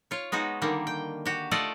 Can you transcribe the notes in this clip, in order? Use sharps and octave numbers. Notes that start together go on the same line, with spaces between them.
F4 C#5
G#3 B3 D#4 F#4
D3 D#3 G3 A#3
G5
F#4 G4
A3 F4 A4 D5 D#5 F#5